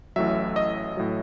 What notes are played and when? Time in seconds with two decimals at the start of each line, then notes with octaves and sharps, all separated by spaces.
0.16 A1 A2 F#3 E5
0.56 D#5
0.97 A2 F#3